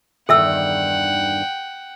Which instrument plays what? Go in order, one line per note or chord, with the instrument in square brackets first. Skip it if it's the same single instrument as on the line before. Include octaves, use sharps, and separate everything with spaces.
[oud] E2 G2 D#3 [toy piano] A4 E5 E6 [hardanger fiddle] F#5 G5